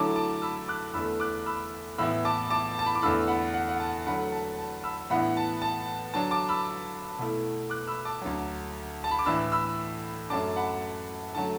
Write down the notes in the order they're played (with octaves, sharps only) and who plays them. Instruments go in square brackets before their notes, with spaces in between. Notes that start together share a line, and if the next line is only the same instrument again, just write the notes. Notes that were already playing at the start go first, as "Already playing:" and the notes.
Already playing: [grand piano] D3 F#3 A3 E4 A5 D6
A5 D6
B5 E6
D6 F#6
E2 D3 A3 B5 E6
D6 F#6
B5 E6
A2 E3 B3 E4 B5 E6
A5 D6
A5 D6
A5
B5
D6
E2 D3 A3 B5 E6
F#5 B5
F#5
F#5
A5
D3 F#3 A3 F#5 B5
A5
A5
B5 E6
A2 E3 B3 D4 F#5 B5
A5
A5
D3 F#3 D4 A5
A5 D6
B5 E6
B2 A3 E4
D6 F#6
B5 E6
A5 D6
D2 D3 F#3
A5
B5
D6
A2 E3 D4 B5 E6
B5 E6
F#2 F#3 A3 D4 A5 D6
F#5 B5
D3 F#3 A3 A5